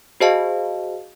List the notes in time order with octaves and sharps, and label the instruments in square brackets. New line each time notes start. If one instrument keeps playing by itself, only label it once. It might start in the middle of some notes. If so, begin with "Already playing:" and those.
[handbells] F#4 G#4 C5 D#5 F5 A5